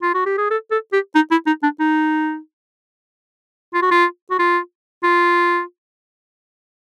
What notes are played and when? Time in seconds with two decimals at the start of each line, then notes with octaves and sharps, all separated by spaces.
0.03 F4
0.14 F#4
0.26 G4
0.38 G#4
0.51 A4
0.71 A4
0.93 G4
1.15 D#4
1.31 E4
1.47 D#4
1.63 D4
1.80 D#4
3.74 F4
3.82 F#4
3.91 F4
4.31 F#4
4.39 F4
5.03 F4